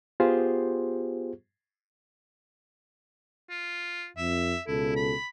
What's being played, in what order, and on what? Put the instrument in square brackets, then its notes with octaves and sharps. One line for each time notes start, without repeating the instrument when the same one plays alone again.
[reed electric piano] B3 F4 G4 G#4 C5
[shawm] F4
[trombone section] F2 [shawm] E5
[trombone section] C#2 B2 A4 [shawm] E4
[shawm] B5